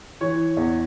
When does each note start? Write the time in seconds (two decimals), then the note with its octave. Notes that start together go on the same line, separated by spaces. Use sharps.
0.21 E3 C#5
0.57 E2